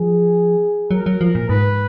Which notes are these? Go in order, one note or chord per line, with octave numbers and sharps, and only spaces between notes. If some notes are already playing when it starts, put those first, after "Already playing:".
Already playing: F3 G#4
F#3 A#4
F#3
F3
A#2
G#2 B4